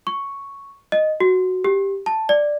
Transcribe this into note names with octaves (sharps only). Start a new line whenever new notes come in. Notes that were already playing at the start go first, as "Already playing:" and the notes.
C#6
D#5
F#4
G4
A5
D5